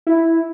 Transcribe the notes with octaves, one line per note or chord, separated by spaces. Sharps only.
E4